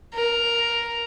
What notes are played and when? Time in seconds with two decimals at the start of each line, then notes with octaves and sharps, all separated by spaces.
0.13 A#4